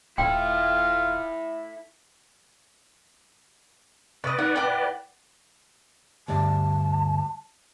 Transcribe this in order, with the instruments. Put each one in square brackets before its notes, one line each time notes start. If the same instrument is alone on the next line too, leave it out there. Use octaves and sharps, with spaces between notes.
[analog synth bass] D#1 [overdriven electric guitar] E4 A4 [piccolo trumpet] F4 [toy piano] G5
[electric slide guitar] C3 [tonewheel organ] B4 D5 [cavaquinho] D#5 C#6
[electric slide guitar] D#4 A#4 [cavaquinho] F#5
[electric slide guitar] E4 G5 [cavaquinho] F#5 D6
[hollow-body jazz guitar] D2 G2 D5 [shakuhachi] A5